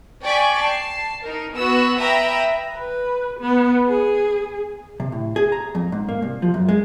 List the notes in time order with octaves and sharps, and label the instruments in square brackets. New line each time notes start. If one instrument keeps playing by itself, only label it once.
[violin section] D5 G5 G#5 C#6 D6 B6
A5 C7
D#4 A#4
B3 F#4 E6
B4 E5 G5 A#5 B5 D#6
[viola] B4
B3
G#4
[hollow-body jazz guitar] C3
A2
G#4
A#5
F2
G#2
A#3
C2
F3
F#2
G#3